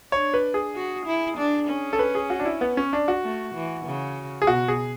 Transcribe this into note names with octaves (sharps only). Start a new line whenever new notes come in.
D4 C#5
B4
G#4
F#4
E4
D4
C#4
A4
B4
G#4
F#4
D4
E4
B3
C#4
D4
F#4
A3
E3
C#3
G#4
B2 F#4
G#4